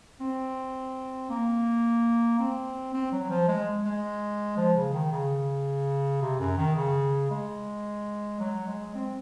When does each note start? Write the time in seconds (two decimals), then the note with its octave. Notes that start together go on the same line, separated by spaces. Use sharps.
0.20 C4
1.30 A#3
2.40 C4
2.94 C4
3.12 F#3
3.30 F3
3.48 G#3
3.85 G#3
4.57 F3
4.76 C#3
4.94 D#3
5.12 C#3
6.22 C3
6.40 F#2
6.58 D#3
6.76 C#3
7.31 G#3
8.40 F#3
8.67 G#3
8.95 C4